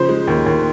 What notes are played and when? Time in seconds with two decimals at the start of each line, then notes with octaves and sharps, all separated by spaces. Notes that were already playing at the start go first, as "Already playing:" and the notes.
Already playing: C#3 F3 C5
0.09 G#3
0.27 D#2
0.46 D#2